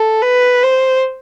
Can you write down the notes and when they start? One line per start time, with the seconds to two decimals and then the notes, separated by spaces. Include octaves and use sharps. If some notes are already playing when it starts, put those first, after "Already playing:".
Already playing: A4
0.22 B4
0.63 C5